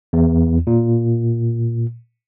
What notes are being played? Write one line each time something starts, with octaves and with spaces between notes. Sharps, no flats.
E2
A#2